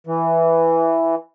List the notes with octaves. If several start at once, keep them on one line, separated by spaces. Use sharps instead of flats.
E3